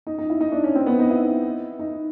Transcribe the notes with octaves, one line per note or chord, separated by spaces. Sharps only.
D#4
D#4
E4
D#4
D4
C#4
C4
B3
D#4
E4
D#4